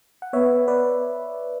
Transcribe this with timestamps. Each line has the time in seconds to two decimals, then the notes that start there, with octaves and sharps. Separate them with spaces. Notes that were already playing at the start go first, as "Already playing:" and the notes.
0.22 F#5
0.33 B3 C#5 E5
0.68 B4 D5